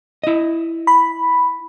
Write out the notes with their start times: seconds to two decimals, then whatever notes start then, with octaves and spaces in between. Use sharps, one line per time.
0.24 E4 D#5
0.87 B5